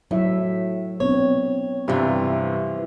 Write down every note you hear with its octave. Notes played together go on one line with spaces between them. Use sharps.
A2 F#3 E4 E5
B3 C4 D4 C#5
G2 C3 E3 F4